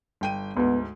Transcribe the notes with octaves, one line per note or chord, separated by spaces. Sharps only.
G1 G5 D#7
D2 G#2 B3